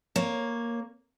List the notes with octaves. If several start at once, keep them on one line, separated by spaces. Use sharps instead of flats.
A#3 C#5